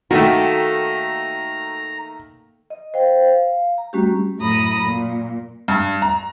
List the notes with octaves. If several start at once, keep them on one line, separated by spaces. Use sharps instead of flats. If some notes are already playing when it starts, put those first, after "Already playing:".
D#3 A3 A#3 F#4 A4 G5 A#5
D#5
C5 F5 G5
F5
A#5
G3 A3 C#4 F#4 G4
F#2 A2 A#5 B5 D#6
A#2
G2
A#5